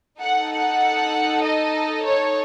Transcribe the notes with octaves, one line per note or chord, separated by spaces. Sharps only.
D#4 A4 F#5
F#5
D#5
C#5